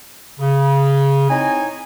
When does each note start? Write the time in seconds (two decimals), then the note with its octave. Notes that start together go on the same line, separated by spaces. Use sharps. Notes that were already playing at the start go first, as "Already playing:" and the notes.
0.39 C#3
1.29 C4 D#4 E4 C#5 D#5 G#5